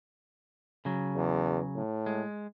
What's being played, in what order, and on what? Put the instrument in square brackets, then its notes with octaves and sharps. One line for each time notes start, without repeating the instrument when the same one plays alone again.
[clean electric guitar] C#3 F#3
[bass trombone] E2
A2
[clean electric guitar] G#3